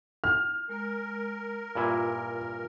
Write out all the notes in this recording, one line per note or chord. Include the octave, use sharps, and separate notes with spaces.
F6
G#3 A#4
G2 A#2 E4 F4